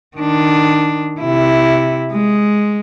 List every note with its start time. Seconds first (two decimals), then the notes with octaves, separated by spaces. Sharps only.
0.17 D#3 D4
1.21 C3 E4
2.12 G#3